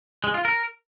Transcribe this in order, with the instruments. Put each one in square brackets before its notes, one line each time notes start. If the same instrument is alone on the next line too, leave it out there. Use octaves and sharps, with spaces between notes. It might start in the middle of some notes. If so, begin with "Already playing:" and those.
[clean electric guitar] G#3
F4
A#4